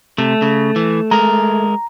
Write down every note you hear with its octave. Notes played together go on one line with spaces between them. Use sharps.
C3 A3
C#3
E3
G#3 A#4 A#5